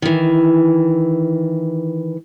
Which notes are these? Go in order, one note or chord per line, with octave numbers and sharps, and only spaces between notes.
D#3 E3